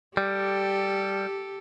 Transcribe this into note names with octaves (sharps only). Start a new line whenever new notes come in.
G3 G4 A4